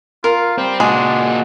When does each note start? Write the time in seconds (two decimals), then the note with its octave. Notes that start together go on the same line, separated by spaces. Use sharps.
0.24 F4 A#4
0.58 G3 C4
0.80 A#2 G#3 D4 F#4 G#4